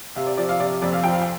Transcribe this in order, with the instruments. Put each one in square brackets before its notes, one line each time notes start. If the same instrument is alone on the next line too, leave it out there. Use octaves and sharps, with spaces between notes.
[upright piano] C3 F5
D5
F3 D5
F5
C3 D5
F2 D5
F5
F3 G5
F5
G5